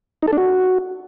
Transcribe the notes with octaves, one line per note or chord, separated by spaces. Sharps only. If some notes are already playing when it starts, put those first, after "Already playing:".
D#4
A4
D4
F#4